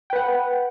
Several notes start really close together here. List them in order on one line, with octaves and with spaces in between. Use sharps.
G5 B4 F#5